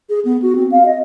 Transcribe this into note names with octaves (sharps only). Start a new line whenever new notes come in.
G#4
B3
F#4
C4
F5
D#5